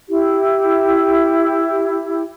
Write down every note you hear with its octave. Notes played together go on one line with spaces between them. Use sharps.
E4 G4